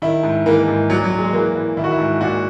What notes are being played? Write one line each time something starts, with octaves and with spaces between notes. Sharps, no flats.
D#3 E4
G#2
E3 A#3
G#2
A#2 F#3
F#3
A#2
G#3
E3 A#3
E3
D#3 E4
F#4
E4
G#2
A#2 F#4